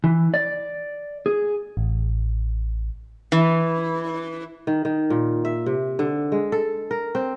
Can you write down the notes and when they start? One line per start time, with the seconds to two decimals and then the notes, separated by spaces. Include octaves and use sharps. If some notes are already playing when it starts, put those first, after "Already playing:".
0.04 E3
0.34 D5
1.26 G#4
1.77 A1
3.32 E3
4.67 D#3
4.85 D#3
5.10 A#2
5.45 E5
5.66 C3
5.99 D3
6.32 G#3
6.52 A4
6.91 A#4
7.15 C4